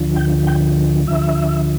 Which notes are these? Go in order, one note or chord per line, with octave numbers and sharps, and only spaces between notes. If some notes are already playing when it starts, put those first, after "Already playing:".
Already playing: D2 D3 F3
G5
G5
D2 D3 F3 E5